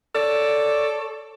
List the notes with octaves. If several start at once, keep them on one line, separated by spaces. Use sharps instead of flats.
A4 C#5 D5